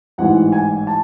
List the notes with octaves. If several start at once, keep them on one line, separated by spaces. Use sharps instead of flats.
A1 G#2 E3 F#5
G#5
A5